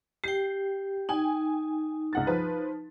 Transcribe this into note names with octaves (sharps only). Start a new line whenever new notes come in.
G4 G5 C7
D#4 G5 G#5
C#2 F#5 A6
F3 B4